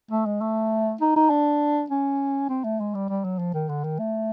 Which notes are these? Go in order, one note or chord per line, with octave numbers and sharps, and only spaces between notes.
A3
G#3
A3
D#4
D#4
D4
C#4
C4
A3
G#3
G3
G3
F#3
F3
D#3
D3
D#3
A3